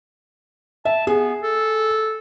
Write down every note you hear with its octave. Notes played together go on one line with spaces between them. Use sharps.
E5 A5
B3 G#4
A4